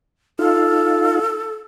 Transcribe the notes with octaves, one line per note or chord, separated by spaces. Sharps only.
D#4 F4 A4 F5